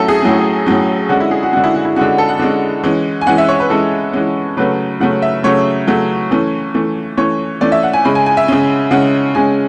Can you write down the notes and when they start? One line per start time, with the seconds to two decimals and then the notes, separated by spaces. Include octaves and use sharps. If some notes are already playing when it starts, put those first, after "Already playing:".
Already playing: A2 F#3 C#4 A4 E5
0.08 G#4
0.22 A2 F#3 C#4
0.66 A2 F#3 C#4
1.09 D3 G#3 C#4 F#4
1.20 E4
1.31 G#4
1.43 F#4
1.53 D3 G#3 C#4 F#4
1.64 E4
1.74 F#4
1.85 E4
1.96 D3 G#3 C#4 F#4
2.18 A4
2.29 F#5
2.39 D3 G#3 C#4
2.83 E3 G#3 C#4
3.21 G#5
3.27 E3 G#3 C#4 F#5
3.38 E5
3.48 C#5
3.60 B4
3.70 E3 G#3 C#4 A4
4.13 E3 G#3 C#4
4.57 C#3 F#3 A3 C#4 B4
5.00 C#3 F#3 A3 C#4 F#5
5.22 E5
5.43 C#3 F#3 A3 C#4 C#5
5.88 C#3 F#3 A3 C#4
6.31 E3 A3 C#4
6.74 E3 A3 C#4
7.17 E3 A3 C#4 C#5
7.61 E3 A3 C#4 D5
7.72 E5
7.83 F#5
7.93 G#5
8.05 C#3 G#3 C#4 B5
8.15 G#5
8.26 G#5
8.37 E5
8.48 C#3 G#3 C#4
8.91 C#3 G#3 C#4 F#5
9.35 C#3 G#3 C#4 G#5